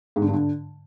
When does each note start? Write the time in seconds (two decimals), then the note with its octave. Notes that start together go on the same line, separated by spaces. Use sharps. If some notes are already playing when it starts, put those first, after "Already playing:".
0.16 G#2
0.22 D3
0.28 G2
0.33 D3